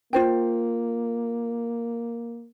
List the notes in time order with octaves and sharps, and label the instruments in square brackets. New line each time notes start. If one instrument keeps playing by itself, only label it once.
[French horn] A#3 [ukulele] F4 C5 G5